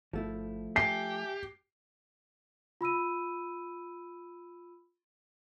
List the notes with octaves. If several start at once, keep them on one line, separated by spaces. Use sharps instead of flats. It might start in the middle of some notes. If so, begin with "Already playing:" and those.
G1 F3 A3 E4
G4 E5 G#5 A5 C7
F4 B5 E6 D#7